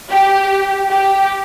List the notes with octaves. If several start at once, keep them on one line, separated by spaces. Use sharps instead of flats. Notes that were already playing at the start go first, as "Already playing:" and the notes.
G4
G4